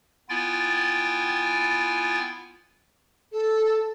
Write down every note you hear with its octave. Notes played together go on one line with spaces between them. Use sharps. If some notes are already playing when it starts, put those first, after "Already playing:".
B3 E4 F4 G5 G#5 A6
A4